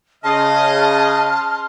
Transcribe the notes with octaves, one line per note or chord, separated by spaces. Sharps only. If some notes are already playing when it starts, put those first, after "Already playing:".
C#3 D#5 A5 C6 F6